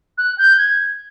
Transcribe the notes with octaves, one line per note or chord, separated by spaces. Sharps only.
F#6
G6
G#6